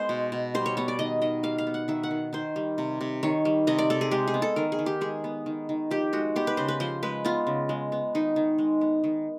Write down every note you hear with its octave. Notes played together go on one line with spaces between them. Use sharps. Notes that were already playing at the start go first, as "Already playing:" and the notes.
Already playing: G#3 B3 C5
B2
B2
G3 C5
C#5
B3 C#5
D5
D#3 D#5
D#3 D#5
G3 F5
F5
B3
F#5
D#3 E5
F#5
D#3
D#3 C5
G3
C3
C3
D#3 C#5
G3
C3 D#5
D5
C3 A4
G#4
G#3 G4
G#4
B3
A4
D#3 A#4
G#4
D#3
G4
G#3 G#4
B3
D#3
D#3
F3 G4
G#3 F#4
B3 G4
B4
C#3 C5
B4
F3 C5
G#3 B4
B3 F4
C#3
G#3
B3
D#3 D#4
D#3
G#3
B3
D#3